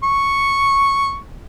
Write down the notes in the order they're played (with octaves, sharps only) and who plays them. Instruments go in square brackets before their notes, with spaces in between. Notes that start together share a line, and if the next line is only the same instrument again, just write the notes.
[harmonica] C#6